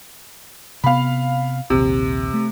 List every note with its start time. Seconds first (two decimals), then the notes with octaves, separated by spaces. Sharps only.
0.84 C3 B3 F5 B5
1.70 A#1 D#2 C3
2.34 A3